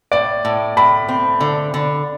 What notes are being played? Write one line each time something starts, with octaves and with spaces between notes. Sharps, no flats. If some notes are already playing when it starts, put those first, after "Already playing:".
A2 D5
A2
A2 B5
C4
D3
D3